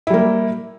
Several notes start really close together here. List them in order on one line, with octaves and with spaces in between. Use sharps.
E4 G3 A#3